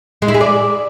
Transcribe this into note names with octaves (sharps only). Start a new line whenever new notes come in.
G#3
E4
G#4
D5